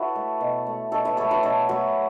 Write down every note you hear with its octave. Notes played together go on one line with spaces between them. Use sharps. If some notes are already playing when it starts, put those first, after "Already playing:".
Already playing: E4 F#4 A4 B4 C#5 E5
A3
B2
A3
B2 A4 C#5
B4 E5
F#3 A3 A4 C#5
F#4 B4
B2 A4 C#5
F#3 A3 F#4 B4